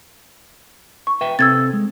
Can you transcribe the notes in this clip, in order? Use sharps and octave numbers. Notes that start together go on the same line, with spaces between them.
C#6
B4 E5 G5
C3 C4 A4 E6 G#6 A6
G#3